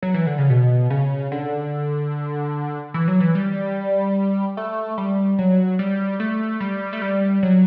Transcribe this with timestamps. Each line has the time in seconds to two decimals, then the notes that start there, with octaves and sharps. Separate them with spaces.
0.02 F#3
0.14 E3
0.27 D3
0.38 C#3
0.50 B2
0.90 C#3
1.32 D3
2.94 E3
3.08 F#3
3.20 E3
3.35 G3
4.57 A3
4.98 G3
5.39 F#3
5.79 G3
6.20 A3
6.60 G3
6.93 A3
7.02 G3
7.43 F#3